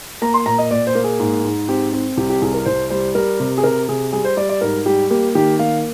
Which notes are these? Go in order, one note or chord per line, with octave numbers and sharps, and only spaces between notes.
A#3 A#5
C6
A#2 A#5
D#5
A#2 D5
C5
A#3
G#4
G#2
G#2
C4 G4
C4
C2 G4
G4
C2 G#4
A#4
C2 C5
G3 C5
G3 A#4
C3
G#4
C3 A#4
C3 G#4
G3 G#4
C5
G3 D5
D5
G#2 A#4
G3 G4
A#3 G4
D#3 G4
A#3 F5